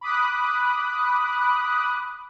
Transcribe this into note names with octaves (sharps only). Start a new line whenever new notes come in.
B5 D6 D#6 F#6